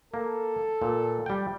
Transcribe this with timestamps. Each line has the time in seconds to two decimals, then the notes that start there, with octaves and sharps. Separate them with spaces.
0.14 A#3 A4
0.82 A#2
1.26 G3 G5